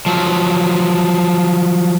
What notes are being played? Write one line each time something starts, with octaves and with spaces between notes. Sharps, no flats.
F3 F#3